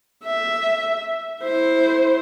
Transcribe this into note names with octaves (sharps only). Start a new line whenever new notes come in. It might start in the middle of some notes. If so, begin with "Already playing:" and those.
E5
E4 C5